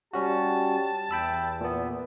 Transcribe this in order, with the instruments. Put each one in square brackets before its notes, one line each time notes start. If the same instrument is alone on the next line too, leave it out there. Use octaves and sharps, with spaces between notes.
[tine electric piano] G3 C#4 F#4 [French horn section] G4 [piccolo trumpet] A5
[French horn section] E2 [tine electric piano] G5 B5 E6
[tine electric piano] A#2 B3